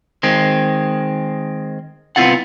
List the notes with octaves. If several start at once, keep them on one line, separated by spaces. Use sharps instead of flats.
D#3 G#3 C4
C2 B3 C4 E4 F4 F#5